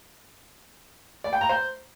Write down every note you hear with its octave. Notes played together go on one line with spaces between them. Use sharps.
D5
G5
A#5
C5